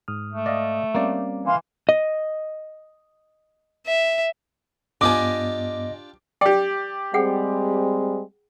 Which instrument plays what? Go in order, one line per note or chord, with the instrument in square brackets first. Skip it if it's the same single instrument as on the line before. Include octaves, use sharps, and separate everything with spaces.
[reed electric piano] G#2 D#6 F6
[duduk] A3
[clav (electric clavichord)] D5 D#5 F5
[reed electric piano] G3 C4 C#4 [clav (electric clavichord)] A#3 D5
[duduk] E3 [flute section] F5 C6
[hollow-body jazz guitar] D#5
[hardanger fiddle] E5
[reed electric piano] G2 B3 [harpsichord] D4 F4 G4 [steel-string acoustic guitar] D#5 G#5 [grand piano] D6
[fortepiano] G4 D5 [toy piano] G5
[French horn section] G3 G#3 C4 [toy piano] G#4 F#5 G5